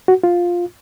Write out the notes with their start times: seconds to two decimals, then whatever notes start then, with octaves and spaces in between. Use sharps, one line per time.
0.08 F#4
0.24 F4